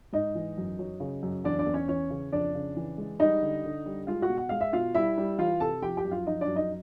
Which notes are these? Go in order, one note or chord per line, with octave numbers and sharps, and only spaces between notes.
G#2 D#4 D#5
E3
F#2
F#3
C#3
F#2
E2 D4 D5
D4 D5
E2
C#4 C#5
E3 C#4 C#5
C#3
F2 D4 D5
C#3
E3
G#3
G3 D#4 D#5
D3
D3
G3
G#3 F4 F5
F#4 F#5
B2
F#5
G#3 F5
E5
B2 F4 F5
G3 E4 E5
G3
E3 F4 F5
C3 A4 A5
F3 G4 G5
G4 G5
F#2
F4 F5
F3 D#4 D#5
D4 D5
F#2
D#4 D#5